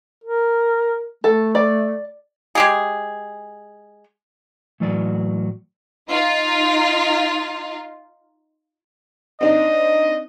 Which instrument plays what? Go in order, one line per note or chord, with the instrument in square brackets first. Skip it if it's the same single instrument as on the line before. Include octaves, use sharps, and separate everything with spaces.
[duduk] A#4
[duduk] A3 [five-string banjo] A4
[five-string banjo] D5
[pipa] G#3 G4 G#4
[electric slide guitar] A2 E3 F#3 D5
[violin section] D#4 F4
[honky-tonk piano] C4 D4 D#4 [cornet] D#5